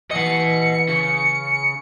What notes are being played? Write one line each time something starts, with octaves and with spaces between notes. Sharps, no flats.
E3 D#5 F#5 C#7
C#3